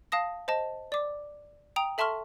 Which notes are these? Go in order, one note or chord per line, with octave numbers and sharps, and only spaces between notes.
F5 A5 D#6 A#6
C5 D#5 A5
D5 D6
G5 A#5 D#6 F7
A4 E5 A5 C6 C#6 F6